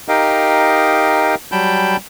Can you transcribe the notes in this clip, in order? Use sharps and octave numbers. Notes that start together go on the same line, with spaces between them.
D#4 G4 A#4 D#5 F5 G5
F#3 G3 G5 A5 B5 G6